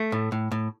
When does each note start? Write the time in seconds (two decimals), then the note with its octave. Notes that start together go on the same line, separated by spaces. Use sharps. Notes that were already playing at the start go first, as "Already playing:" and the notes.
Already playing: A3
0.12 A2
0.32 A2
0.51 A2